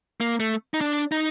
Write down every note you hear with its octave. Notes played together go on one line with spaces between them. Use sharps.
A#3
A3
D#4
D4
D#4